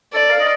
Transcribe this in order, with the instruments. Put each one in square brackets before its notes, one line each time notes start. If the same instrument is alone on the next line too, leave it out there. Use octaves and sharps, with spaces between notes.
[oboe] A4 [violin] D5
[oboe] F5
D#5